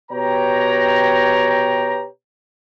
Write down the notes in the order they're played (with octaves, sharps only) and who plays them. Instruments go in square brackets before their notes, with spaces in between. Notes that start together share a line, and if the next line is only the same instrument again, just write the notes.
[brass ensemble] B2 G4 B4 C#5 G5 A#5